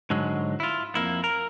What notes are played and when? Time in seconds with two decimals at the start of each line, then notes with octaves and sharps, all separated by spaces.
0.10 G#2 D3 F#3 G#3
0.60 E4 F4
0.95 F2 A#3 E4
1.24 A#4